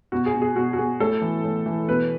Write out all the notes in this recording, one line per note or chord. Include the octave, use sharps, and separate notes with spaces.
B2 F#4
G#4
B2
G#4
B2 F#4
F#4
B2 G#4
A2 A4
E3
A2
E3
B2 B4